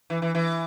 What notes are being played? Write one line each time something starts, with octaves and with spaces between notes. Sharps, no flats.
E3
E3
E3